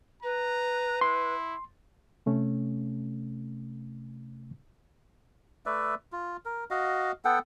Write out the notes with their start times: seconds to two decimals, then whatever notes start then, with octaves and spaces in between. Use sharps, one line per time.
0.22 B4 A#5
1.01 E4 C6
2.26 C3 A3 C#4
5.66 A3 B4 D5 E5
6.12 F4
6.45 A#4
6.71 F#4 D#5 F5
7.25 B3 A4 F#5 G5